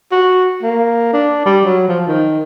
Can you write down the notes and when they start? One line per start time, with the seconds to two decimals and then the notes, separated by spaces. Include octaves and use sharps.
0.12 F#4
0.63 A#3
1.13 D4
1.46 G3
1.65 F#3
1.88 F3
2.07 D#3